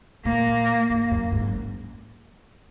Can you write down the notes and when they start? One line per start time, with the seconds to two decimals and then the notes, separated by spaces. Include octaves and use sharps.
0.25 A#2 A#3
0.90 G#2
1.11 F#2
1.32 G#2
1.47 F#2